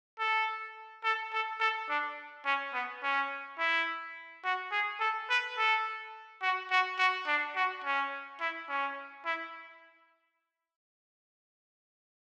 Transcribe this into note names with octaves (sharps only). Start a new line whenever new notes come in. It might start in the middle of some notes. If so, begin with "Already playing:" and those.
A4
A4
A4
A4
D4
C#4
B3
C#4
E4
F#4
G#4
A4
B4
A4
F#4
F#4
F#4
D4
F#4
C#4
E4
C#4
E4